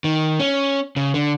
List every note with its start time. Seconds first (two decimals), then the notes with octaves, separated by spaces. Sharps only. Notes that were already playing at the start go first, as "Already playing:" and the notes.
0.04 D#3
0.40 C#4
0.96 C#3
1.14 D3